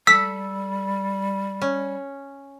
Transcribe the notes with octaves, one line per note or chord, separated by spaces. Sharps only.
G3 A4 E6 B6
C#4